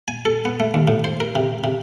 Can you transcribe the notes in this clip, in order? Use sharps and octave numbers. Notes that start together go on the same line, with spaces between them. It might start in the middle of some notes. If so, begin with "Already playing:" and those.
G#5
A4
B3
A3
D#2
A2
C5
A#4
C3
C3